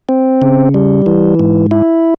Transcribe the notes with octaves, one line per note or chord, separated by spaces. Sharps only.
C4
C#3
G3
E3
G#2
E4